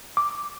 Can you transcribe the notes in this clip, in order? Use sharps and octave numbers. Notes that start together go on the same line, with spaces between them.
D6